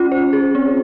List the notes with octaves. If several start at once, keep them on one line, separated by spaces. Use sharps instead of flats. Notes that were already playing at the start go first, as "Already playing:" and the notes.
Already playing: C#4 F4
C5
G#4
C4